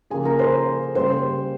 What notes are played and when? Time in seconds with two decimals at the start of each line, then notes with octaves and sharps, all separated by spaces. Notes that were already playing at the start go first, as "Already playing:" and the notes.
0.10 C#3 F3 A#3 G#4 G#5
0.25 A#4 A#5
0.39 C5 C6
0.95 C#3 G3 A#3 C5 C6